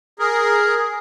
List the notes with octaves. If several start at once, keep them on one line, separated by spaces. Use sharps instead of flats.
G#4 A#4